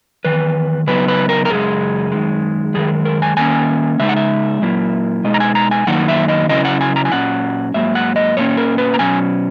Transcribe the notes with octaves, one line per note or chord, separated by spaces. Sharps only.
E2 D#3 B4
C#3 F#3 B3 D#4 B4
B4
A#4
A#4
F#2 C#3 G#3 G#4
F#2 D#3 G#3
F#2 D#3 G#3 G#4
A#4
G#5
D#3 A#3 C#4 G#5
C#3 G#3 D#4 E5
F#5
E5
A#2 F#3 A#3 E4
B2 G#3 D#4 D#5
A#5
G#5
A#5
G#5
F#2 D#3 F#3 A#3 D#4 F#5
E5
D#5
C#3 F#3 C#4 E4 D#5
F#5
G#5
A#5
G#5
A#2 F#3 C#4 F#5
G#2 F#3 A#3 E5
F#5
D#5
A#2 A#3 C#4 C#5
A#4
B4
A#5
B2 F#3 C#4 G#5